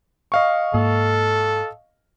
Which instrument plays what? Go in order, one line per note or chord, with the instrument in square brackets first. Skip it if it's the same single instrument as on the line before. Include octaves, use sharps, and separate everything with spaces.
[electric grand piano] D#5 F5 C#6
[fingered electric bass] G#2 A#3 [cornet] A4